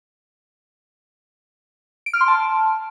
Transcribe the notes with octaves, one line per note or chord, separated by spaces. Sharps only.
D7
F6
C6
A5